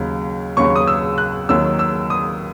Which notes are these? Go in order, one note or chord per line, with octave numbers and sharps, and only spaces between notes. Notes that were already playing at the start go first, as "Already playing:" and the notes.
Already playing: D#2 C#3 F#3
D#2 C#3 F#3 C#6
D#6
E6
F#6
D#2 D#3 F#3 E6
E6
D#6